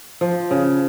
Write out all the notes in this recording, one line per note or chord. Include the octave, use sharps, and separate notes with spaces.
F3
C#3